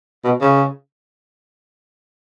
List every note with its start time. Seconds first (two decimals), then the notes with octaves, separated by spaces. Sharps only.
0.24 B2
0.41 C#3